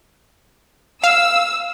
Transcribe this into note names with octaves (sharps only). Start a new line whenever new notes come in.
F5 E6